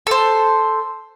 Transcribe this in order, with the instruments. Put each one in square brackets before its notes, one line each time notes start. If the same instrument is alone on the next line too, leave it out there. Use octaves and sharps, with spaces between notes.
[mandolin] A4 C5